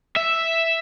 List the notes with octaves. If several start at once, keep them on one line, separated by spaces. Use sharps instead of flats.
E5